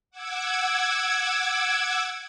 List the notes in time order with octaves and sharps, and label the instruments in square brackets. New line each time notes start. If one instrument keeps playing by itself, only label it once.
[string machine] F#5 D6 E6 G#6